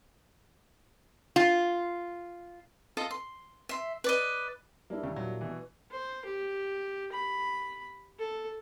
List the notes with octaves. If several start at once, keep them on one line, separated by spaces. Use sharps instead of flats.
F4
F4 A4 D#5 A5
C6
E5 C6
B4 D5 D#5
G3 A#3 D4 E4
E1 D#2 C#3
A#2 F#3
B2 E3
C5
G4
B5
A4